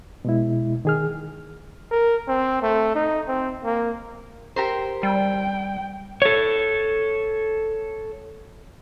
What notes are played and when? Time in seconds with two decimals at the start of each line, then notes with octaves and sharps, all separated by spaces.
0.25 B2 G#3 E4
0.85 D#3 G#4 F6
1.91 A#4
2.28 C4
2.62 A3
2.95 D#4
3.28 C4
3.64 A#3
4.56 G4 A#4 C5
5.03 G3 G5
6.22 A4 C#5